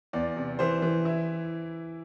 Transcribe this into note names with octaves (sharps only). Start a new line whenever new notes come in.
E2 D5
C3
E3 C5
E3
E4